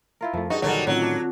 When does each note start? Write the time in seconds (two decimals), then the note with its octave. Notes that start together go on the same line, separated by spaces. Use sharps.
0.21 E4 F4 A#4
0.34 F2 F3 A3 A#4
0.50 G2 D#4 F#4 G#4
0.62 A#1 D3 D#3 F#3 G3 D#4
0.87 A2 D#3 F#3 C4 C#4 F4
1.02 D4